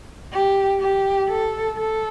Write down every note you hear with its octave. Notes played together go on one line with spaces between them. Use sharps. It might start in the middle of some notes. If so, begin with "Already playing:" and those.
G4
G4
A4
A4